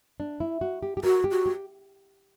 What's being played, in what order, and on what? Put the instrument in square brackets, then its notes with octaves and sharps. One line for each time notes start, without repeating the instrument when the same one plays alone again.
[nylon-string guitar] D4
E4
F#4
G4
G4
[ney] F#4 [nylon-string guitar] A#4
[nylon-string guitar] G4
[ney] F#4
[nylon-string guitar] G4